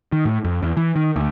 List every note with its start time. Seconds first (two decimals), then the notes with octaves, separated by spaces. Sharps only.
0.12 D#3
0.25 A2
0.44 F2
0.62 E2
0.77 E3
0.96 D#3
1.16 D2